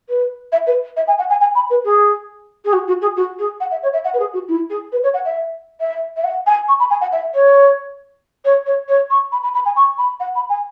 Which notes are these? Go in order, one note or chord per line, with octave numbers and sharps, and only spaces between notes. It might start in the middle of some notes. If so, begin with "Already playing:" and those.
B4
E5
B4
E5
G#5
F#5
G#5
G#5
B5
B4
G#4
G#4
F#4
F#4
G#4
F#4
G#4
F#5
E5
C#5
E5
F#5
B4
G#4
F#4
E4
G#4
B4
C#5
F#5
E5
E5
E5
F#5
G#5
C#6
B5
G#5
F#5
E5
C#5
C#5
C#5
C#5
C#6
B5
B5
B5
G#5
C#6
B5
F#5
B5
G#5